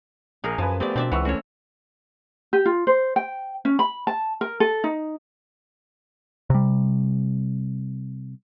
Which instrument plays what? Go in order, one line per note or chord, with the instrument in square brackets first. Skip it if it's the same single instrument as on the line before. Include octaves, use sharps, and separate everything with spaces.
[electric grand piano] A#1 [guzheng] G#4 A#4
[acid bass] F#2 [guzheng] F3 [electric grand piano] B4 G#5 A5
[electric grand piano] A3 B3 G4 [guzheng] C4 D5
[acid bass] B2 [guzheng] C4 D5 E5 [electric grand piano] D4
[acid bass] C#2 [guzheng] E3 [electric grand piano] F#5 C#6 E6
[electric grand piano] A3 C#4 [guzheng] F#4 C#5
[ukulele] G4
F4
C5
G5
C#4
B5
A5
A#4
A4
D#4
[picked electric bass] C3 G3